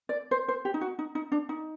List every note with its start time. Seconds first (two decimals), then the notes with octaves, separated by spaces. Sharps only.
0.09 D5
0.31 C5
0.48 C5
0.65 G4
0.74 D#4
0.81 F#4
0.99 D#4
1.15 D#4
1.32 D4
1.49 D#4